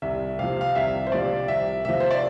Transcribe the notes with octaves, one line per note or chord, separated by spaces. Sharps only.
C2 E5
C3 F3 F5
F5
C2 E5
C5
C3 F3 D5
C2 E5
C3 F3 E5
C5
D5